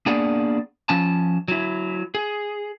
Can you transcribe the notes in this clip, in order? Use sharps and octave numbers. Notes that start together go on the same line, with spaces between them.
A#3 B3 D4 G#4 D5 F#5
F3 C#4 A5
F#3 E4
G#4